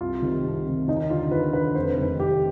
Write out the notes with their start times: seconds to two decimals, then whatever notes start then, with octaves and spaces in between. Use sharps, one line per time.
0.01 C2 F4
0.22 C3 D#3
0.45 C2
0.66 C3 D#3
0.88 D#2 D#4
1.10 D3 F4
1.31 D#2 B4
1.53 D3 B4
1.75 F1 C5
1.98 F2 C3 D#3 B4
2.20 F1 G4